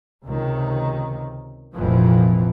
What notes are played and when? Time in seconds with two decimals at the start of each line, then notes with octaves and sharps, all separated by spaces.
0.23 C#2 C3 D#3
1.75 F1 A#1 F2 A#2 E3 F3